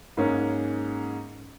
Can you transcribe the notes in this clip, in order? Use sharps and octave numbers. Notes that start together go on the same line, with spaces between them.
G#2 G#3 A#3 C#4